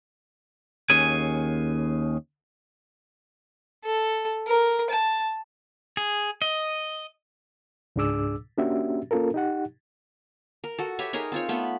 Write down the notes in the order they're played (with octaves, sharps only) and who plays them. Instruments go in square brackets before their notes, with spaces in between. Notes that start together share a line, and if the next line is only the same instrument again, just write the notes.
[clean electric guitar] D#2 C#4 G#4 G#5
[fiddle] A4
A#4
A5
[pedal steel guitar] G#4
D#5
[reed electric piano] C#2 G#2 D4 G#4 D6 E6
A#3 C#4 D4 F#4 G4 E5
A#3 C#4 F4 A4 A#4
D#4 G4 F#5
[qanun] A#4
F#4 A4
G4 B4 C#5 E5
D#4 G#4 A#4 C#5
C4 F4 C#5
A3 B3 B5